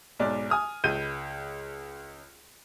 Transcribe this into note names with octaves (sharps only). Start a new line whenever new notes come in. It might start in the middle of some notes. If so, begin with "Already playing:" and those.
B1 G#2 D5
G#5 D#6 F6
C#2 G6 D#7